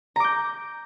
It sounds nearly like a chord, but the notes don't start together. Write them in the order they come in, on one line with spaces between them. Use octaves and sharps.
A#5 D6 G6